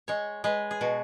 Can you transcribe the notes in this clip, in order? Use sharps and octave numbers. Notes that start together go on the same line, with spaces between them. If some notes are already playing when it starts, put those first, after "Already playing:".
G#3 C#5
G#3 B4
G#4
B2 F#4